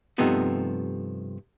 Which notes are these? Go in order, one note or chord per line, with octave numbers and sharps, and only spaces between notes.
G2 C3 F3 A3 B3 D#4